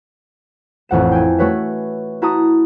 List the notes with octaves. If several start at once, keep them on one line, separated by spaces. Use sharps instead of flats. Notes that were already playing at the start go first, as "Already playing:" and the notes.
A1 F2 F#5 E7
G5 G#5
A3 C#4 F#4 B4 C#5 E5
E4 F#4 A5 A#5 D#6